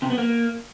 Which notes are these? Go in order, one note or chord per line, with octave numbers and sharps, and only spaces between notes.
C3
B3
A#3